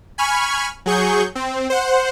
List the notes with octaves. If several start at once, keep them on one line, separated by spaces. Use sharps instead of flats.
G#5 B5 C#6 F6
F#3 G#4 C#6 G6
C4
C5 F#5